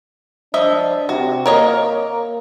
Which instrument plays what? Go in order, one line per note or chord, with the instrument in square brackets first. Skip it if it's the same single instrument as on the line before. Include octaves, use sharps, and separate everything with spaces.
[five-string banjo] F3 D#5 E5 [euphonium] D4
[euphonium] C3 [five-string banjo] F#4
[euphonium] A#3 [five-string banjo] A#4 C#5 D#5